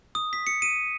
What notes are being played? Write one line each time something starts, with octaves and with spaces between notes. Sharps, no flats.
D#6
B6
C#7
D#7